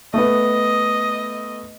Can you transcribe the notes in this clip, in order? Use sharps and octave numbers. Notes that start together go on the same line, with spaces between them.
A3 B3 D#5